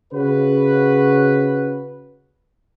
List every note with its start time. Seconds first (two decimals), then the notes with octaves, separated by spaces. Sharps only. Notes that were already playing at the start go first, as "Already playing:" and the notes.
0.13 C#3 F#4 B4